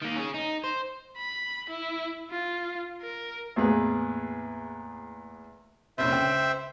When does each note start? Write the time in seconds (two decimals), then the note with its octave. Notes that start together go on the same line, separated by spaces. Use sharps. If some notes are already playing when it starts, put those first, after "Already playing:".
0.02 D#3 A#3
0.16 C#4 G#4
0.34 D#4
0.64 C5
1.18 B5
1.70 E4
2.30 F4
3.02 A#4
3.56 E2 A2 A#3 G#4 B4
5.98 F1 A#1 C#4 C5 E5
6.10 C#2 G5